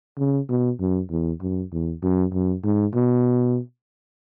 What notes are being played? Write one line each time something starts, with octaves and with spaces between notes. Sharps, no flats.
C#3
B2
F#2
E2
F#2
E2
F#2
F#2
G#2
B2